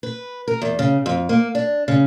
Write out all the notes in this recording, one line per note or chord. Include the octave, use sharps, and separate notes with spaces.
B4
A#4
E2
C#3
F2
A#3
D4
C#3